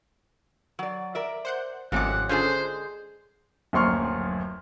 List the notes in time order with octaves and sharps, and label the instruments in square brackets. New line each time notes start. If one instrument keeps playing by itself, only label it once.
[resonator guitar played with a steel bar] F#3 D5
A#4 D5 E5
[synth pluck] C5 F#5 G6
[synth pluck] G#1 A3 D6 [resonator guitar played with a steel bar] F2 C3 C#4 [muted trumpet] F#5
[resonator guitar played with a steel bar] D3 G#3 G#4 [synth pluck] C#4 F4 A4 [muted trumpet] C5
[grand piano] D1 A#1 F#2 C6 C#6 F6